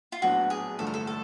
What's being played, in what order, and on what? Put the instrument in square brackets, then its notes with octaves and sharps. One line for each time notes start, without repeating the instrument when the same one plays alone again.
[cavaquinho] F4
[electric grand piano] A#1 A2 F#3 B3 D4 [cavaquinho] F#4
[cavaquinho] G#4
[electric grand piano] A1 G2 D3 F3 A3 [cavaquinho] A4
[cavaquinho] A#4
A4
A4